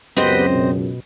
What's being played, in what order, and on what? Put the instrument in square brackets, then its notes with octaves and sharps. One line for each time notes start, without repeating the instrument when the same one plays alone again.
[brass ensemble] C#2 F#2 [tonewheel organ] B3 G4 B4 [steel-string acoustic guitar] C4 C5 D#5
[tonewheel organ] B2